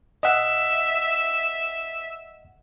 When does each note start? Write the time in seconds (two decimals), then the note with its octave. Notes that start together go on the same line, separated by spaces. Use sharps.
0.23 D#5 E5 F#5